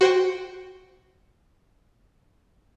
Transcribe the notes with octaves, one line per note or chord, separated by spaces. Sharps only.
F#4 C5 F#5 G5